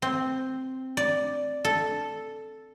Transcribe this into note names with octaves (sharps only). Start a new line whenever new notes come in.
C4
D5
A4